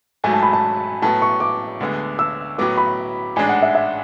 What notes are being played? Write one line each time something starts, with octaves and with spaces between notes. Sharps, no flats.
G#1 G#2 F#3 A3 G#5
A5
B5
A5
A2 F#3 B3 A5
C#6
D6
D2 D3 G#3 B3
E6
A2 F#3 B3 D6
B5
A1 G#2 G#3 D4 G#5
F#5
E5
E5